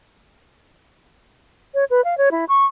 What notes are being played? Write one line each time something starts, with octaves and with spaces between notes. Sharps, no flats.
C#5
B4
F5
C#5
E4
C#6